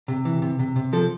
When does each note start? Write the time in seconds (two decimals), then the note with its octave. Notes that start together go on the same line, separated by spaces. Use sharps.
0.08 C3
0.25 E3
0.42 C3
0.59 C3
0.76 C3
0.93 F3 A4